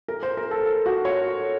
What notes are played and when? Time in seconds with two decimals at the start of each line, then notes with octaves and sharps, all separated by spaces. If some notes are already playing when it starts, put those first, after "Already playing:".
0.08 A#4
0.23 C5
0.37 A#4
0.51 A4
0.65 A4
0.86 F#4
1.05 C#5